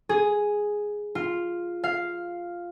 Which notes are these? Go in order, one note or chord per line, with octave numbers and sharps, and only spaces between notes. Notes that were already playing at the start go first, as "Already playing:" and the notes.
G#4
F4
F5